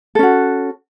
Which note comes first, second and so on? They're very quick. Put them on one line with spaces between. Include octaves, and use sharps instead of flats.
A4 C#4 F#4